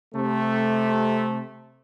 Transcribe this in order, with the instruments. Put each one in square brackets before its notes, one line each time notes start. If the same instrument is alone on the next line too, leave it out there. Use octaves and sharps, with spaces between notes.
[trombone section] C3 A3